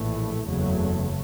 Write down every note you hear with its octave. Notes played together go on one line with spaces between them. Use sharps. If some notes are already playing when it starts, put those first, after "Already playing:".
Already playing: A#1 A2 E3 A3
F#1 E2 C#3 F#3 A3